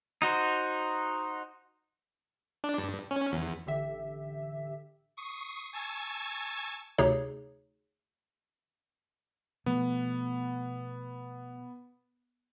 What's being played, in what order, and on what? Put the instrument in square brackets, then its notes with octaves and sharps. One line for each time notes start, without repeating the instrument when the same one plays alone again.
[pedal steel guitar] D#4 F#4 C5
[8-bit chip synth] D4
G2
C#4
E2
[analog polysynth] A1 D3 G4 E5
[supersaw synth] C#6 D#6 C7
G#5 A5 C#6 E6 G#6 A6
[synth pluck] D2 C3 D#4 G#4 C#5
[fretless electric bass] B2 F3 A3 [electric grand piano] B3